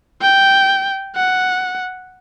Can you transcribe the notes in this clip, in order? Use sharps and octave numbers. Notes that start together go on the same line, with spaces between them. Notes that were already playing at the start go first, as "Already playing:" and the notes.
G5
F#5